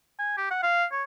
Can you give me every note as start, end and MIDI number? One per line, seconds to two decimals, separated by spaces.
0.19 0.35 80
0.37 0.49 67
0.51 0.58 78
0.63 0.85 77
0.92 1.03 73